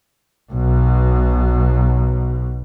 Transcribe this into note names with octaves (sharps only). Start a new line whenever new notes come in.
B1 B2